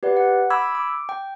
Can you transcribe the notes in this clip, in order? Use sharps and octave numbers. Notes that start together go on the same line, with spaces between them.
G4 B4 D5 F#5
F#5
B5 D6 E6 G#6
D6
G5